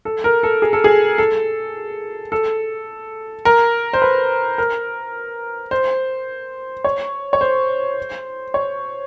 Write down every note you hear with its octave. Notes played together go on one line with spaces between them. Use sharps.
A4
A#4
A4
G#4
A4
G#4
A4
A4
A#4
C5
B4
A#4
C5
C#5
C#5
C5
C#5